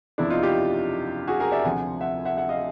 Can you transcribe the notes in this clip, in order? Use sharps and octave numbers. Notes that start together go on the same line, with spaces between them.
F#1 E2 C3 F3 D4 E4
D#4 F4
F4 G4
F#4 G#4
G#4 A#4
D5 E5
D2 C3 F3 F#5 G#5
E5 F#5
E5 F#5
E5 F#5
D#5 F5